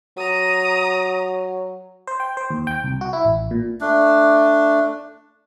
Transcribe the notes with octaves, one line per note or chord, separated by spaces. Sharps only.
F#3 A#5 D#6
C5
G5
C5
D#2
G5
C2
F#4
E4
A1
A#2
A3 D4